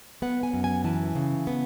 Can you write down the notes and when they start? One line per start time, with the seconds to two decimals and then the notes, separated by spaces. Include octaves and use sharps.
0.22 B3 F#5
0.43 G#5
0.54 F#2
0.64 G#5
0.84 E3 A5
1.15 C#3
1.47 B3